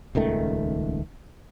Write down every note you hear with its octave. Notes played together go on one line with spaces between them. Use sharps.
D#1 C#2 D#3 A3